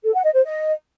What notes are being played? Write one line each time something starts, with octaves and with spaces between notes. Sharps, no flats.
A4
F#5
D#5
C5
D#5